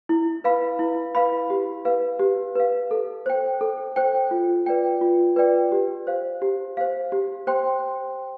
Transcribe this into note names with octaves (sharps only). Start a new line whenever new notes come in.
E4
B4 F5 B5
E4
B4 F5 B5
G4
B4 F5
G4
B4 F5
A4
C5 G5
A4
C5 G5
F4
B4 D5 G5
F4
B4 D5 G5
G4
C5 F5
G4
C5 F5
G4
C5 G5 C6